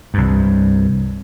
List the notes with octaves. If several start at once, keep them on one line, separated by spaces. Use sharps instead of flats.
C2 G2